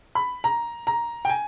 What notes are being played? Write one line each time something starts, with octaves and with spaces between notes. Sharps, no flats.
B5
A#5
A#5
G5
G#5